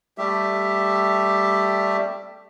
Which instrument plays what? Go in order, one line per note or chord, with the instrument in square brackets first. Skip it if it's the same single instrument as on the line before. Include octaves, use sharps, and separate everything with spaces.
[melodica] G3 A3 G4 E5